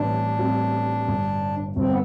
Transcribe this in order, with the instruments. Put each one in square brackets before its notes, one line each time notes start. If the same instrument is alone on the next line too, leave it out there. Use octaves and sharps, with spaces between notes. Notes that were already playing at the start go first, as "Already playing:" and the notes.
Already playing: [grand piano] A1 A2 E3 G3 C4 [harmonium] D4
[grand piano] A1 A2 E3 G3 C4
G1 G2 D3
[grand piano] G1 G2 D3 [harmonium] C4
[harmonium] B3